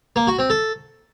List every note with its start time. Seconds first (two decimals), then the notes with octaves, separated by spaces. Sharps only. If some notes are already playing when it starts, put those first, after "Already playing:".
0.16 A#3
0.27 F#4
0.39 C4
0.50 A4